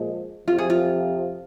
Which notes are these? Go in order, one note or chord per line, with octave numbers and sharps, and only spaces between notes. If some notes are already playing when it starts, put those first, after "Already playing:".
Already playing: A#2 F3 G#3
F2 C3 F3 F4
G#4
F4